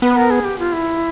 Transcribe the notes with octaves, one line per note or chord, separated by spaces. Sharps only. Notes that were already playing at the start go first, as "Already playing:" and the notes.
B3 B4
A#4
G#4
G4
F4
E4